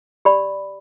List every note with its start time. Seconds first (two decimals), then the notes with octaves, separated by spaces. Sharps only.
0.25 G4 D5 B5